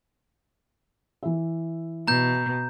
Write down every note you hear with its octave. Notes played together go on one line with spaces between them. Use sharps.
E3 E5
B2 A#5 G6